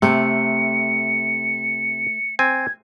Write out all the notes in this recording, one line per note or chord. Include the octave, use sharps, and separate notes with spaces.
C3 A3 C#7
C4 G#5 G#6